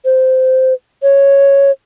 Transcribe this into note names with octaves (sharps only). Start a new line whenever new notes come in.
C5
C#5